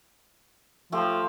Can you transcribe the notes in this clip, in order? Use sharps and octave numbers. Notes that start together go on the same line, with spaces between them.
F3 A3 G4